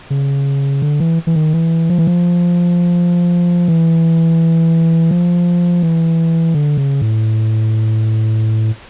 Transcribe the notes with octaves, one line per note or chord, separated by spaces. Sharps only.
C#3
D3
E3
E3
D#3
E3
F3
E3
F3
E3
F3
E3
D3
C#3
A2